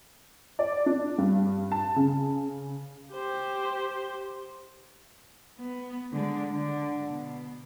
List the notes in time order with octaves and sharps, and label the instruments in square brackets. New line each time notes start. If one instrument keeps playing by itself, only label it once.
[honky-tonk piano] D5
D4
G2
A5
C#3
[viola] G4 C5
[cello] B3
D3 G#3
D3
B2